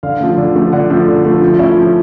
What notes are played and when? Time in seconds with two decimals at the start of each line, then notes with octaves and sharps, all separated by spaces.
0.03 D3 F5
0.20 F3 A3
0.38 D3
0.56 F3 A3
0.73 D3 F#5
0.90 F3 A3
1.08 D3
1.25 F3 A3
1.42 F3
1.59 A3 C#4 E4
1.77 F3